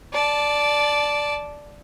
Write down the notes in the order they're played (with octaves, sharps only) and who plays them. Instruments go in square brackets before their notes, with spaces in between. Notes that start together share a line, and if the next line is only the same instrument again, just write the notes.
[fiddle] D5 A5